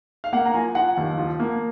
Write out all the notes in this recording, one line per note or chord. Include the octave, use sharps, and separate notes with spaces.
F5
A#3 F#5
A#5
F3 G#5
F3 F#5
D#2
F3
A#3